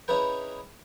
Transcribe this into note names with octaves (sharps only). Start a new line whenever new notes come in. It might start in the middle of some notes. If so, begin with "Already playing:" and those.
C#4 D#4 E4 G#4 B4 G5